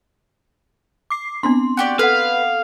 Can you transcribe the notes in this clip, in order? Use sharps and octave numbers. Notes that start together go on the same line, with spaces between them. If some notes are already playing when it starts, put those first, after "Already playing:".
D6 C7
B3 C4 D4 C6
F#4 G4 D5
A4 B4 F5 F#5